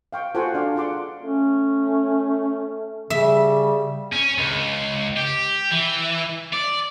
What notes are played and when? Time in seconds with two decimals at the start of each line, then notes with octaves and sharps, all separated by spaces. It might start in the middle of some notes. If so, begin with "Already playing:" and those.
0.13 F5 G5 C#6
0.35 F4 F#4 A4 C5 F#5 G#5
0.54 D4 D5 F5
0.76 F4 G#4 F#5 C6 D6
1.23 A3 C#4
3.10 C#3 G3 E5
4.12 C#4
4.38 C#2
5.17 G4
5.71 E3
6.53 D5